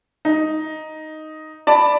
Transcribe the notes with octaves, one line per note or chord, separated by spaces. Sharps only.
D#4
D5 A5 B5 D6